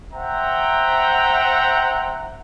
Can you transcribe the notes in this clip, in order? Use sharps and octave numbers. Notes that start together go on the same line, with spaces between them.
C5 E5 F#5 G5 A#5